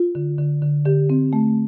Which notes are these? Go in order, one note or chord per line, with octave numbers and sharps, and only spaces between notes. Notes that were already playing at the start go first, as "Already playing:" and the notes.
Already playing: F4
D3
D3
D3
D3 G4
C4
A3